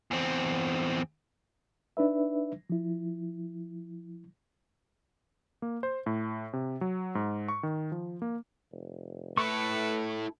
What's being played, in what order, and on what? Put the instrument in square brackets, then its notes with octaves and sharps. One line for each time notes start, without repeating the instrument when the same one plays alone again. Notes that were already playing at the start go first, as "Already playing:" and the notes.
[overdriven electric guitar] E2 C4
[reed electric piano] D4 D#4 B4 E5
F3 E4
[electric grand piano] A#3
C5
A2
C3
F#3
G#2
C#6
D#3
F3
A#3
[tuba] F1
[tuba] A3 [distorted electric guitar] E4 A4 [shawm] B4 [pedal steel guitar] C#6